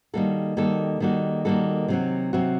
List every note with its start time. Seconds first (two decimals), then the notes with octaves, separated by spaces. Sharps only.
0.14 D#3 G3 A#3 F#4 A4
0.57 D#3 G3 A#3 F#4 A4
1.00 D#3 G3 A#3 F#4 A4
1.45 D#3 G3 A#3 F#4 A4
1.88 C3 F#3 C4 F#4
2.33 C3 F#3 C4 F#4